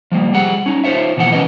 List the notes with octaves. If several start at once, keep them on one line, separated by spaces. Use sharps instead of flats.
F3 G3 A#3
G3 G#4 F#5
C#4 D#4
D#4 F4 A4 C5 C#5 E5
B2 E3 F3 A#3 F#5
C#3 E3 C#4 D#4 B4 D#5